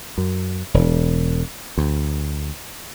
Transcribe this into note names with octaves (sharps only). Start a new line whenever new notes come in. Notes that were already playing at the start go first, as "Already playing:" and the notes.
F#2
E1
D2